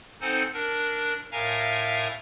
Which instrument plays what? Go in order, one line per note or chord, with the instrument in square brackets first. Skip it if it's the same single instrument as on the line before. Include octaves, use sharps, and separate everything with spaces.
[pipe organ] C4 D#4 A4 C5 F#5 G#5
D4 A#4
A2 A#4 E5 F5 G#5 A#5